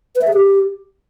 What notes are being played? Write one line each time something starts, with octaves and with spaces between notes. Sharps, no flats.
B4
E5
G#4
G4